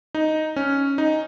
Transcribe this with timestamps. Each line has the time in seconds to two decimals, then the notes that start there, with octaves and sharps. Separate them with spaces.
0.14 D#4
0.56 C#4
0.98 D#4